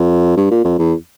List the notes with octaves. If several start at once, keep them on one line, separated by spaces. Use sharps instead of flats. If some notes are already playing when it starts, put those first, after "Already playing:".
Already playing: F2
G2
A#2
F2
E2